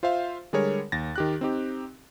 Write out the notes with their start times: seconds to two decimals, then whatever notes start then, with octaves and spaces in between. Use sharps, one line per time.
0.03 F4 C5 E5 F5
0.53 D3 G3 G#3 G#4 A#4 C#5
0.92 D#2 A6 A#6
1.16 D#3 G4 F#6
1.41 C4 D#4 G4